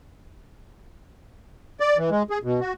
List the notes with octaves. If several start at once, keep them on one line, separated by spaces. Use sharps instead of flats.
D5
E3
G#3
G#4
B2
F#4